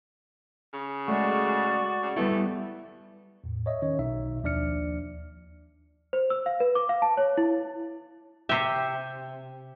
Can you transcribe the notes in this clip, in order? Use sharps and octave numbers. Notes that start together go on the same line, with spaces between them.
C#3
G#3 A3 F#4 D5
C#3
G3 A3 B3 E4
E2 A2
C#5 D#5 E5
D#3 C#4 C#5
B1 B2 D#4 E5
D#2 F3 D4 D5 F6 C#7
C5
E6
F5
B4
D6
F5
A5
C#5
E4
C3 G4 E5